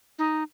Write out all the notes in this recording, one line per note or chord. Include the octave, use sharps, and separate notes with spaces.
D#4